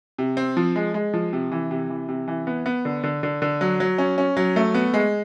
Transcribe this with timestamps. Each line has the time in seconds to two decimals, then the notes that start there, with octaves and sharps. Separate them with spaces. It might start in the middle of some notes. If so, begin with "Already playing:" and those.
0.18 C3
0.37 C4
0.57 F3
0.76 G#3
0.94 G#3
1.14 F3
1.33 C3
1.52 E3
1.71 C3
1.90 E3
2.09 C3
2.28 E3
2.47 B3
2.66 B3
2.85 D3
3.04 D3
3.23 D3
3.42 D3
3.61 F#3
3.80 F#3
3.98 C#4
4.18 C#4
4.37 F#3
4.56 A3
4.74 B3
4.94 G#3